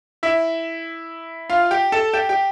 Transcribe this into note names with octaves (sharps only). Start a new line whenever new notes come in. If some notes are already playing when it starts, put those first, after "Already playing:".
E4 E5
F4 F5
G4 G5
A4 A5
G4 G5
G4 G5